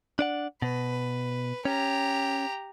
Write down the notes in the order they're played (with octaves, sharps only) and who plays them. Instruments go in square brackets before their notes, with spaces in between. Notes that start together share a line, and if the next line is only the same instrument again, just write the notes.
[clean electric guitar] D4 D5 F#5
[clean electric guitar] B2 [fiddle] B4
[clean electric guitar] C#4 [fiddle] G4 A#5